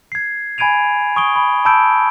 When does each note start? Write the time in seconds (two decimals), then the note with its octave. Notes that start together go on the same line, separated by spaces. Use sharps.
0.12 G#6 C7
0.58 G#5 B5 G#6 D7 D#7 F7
1.16 C#6 D#6 D7 G7
1.36 B5
1.65 A5 B5 E6 G6 D7